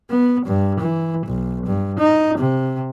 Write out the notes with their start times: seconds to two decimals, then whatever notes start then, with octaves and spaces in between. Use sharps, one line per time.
0.10 B3
0.46 G2
0.80 E3
1.26 B1
1.66 G2
1.99 D#4
2.38 C3